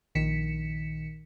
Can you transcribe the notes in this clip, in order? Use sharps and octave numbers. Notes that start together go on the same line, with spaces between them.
A#1 D#3 B6 C#7 E7